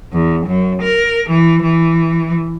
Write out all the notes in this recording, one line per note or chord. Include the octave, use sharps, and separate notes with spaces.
E2
F#2
A#4
E3
E3